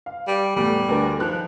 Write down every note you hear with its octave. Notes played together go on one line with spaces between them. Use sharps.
F5
G3
E2 A2 G3
D2 D4 A#4
D#3 F3 F#6